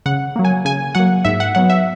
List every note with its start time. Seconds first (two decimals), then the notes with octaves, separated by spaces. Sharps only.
0.06 C#3 F#5
0.36 F#3 A#3
0.45 G#5
0.65 C#3 G#5
0.95 F#3 A#3 F#5
1.25 G#2 E5
1.40 F#5
1.55 F#3 B3 F#5
1.70 E5